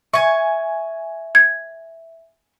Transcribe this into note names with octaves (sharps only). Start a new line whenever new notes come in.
E5 G#5 C#6
G#6